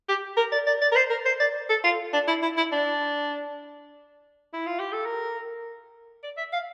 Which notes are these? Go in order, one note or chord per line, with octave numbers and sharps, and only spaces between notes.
G4
A#4
D5
D5
D5
A#4
C5
A#4
C5
D5
A4
F4
D4
E4
E4
E4
D4
E4
F4
G4
A4
A#4
D5
E5
F5